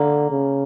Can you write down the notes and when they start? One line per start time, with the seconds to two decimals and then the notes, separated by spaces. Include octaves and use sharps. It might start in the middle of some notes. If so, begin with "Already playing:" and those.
Already playing: D3 A#3
0.30 C#3